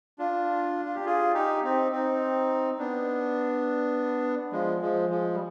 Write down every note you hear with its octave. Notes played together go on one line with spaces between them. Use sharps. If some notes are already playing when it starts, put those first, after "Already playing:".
D4 F4
F4
G4
F4 G#4
D#4 G4
C4 D#4
C4 D#4
B3 D4
F3 G#3
F3 G#3
F3 G#3
G3